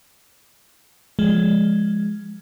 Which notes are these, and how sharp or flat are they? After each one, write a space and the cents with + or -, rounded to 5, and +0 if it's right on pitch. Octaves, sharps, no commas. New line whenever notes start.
F3 +0 G#3 +0